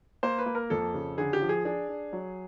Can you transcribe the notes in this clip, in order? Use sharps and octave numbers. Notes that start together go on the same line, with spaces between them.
A#3 C5
B4
A#3
A#4
F2 A4
C#3
D3 G#4
G4
F3
G#4
D4 G#4
D4
F#3